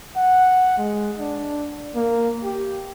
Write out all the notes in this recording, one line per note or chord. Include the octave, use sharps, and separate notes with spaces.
F#5
G#3
D4
A#3
G4